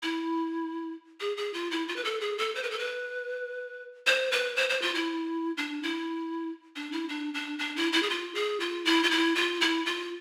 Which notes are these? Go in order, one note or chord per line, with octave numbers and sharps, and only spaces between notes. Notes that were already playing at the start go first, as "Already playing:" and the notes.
E4
G#4
G#4
F4
E4
F4
B4
A4
G#4
A4
C5
B4
A4
B4
C5
B4
C5
C5
F4
E4
D4
E4
D4
E4
D4
D4
D4
E4
E4
G#4
F4
G#4
F4
E4
F4
E4
F4
E4
F4